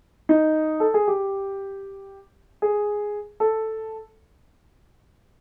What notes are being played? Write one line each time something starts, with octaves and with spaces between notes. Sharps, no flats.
D#4
A4
G#4
G4
G#4
A4